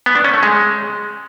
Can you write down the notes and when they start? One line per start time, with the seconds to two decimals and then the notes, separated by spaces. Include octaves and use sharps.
0.06 B3
0.15 D4
0.24 C#4
0.34 A3
0.43 G#3